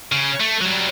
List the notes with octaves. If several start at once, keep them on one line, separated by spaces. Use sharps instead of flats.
C#3
A3
F#3 G3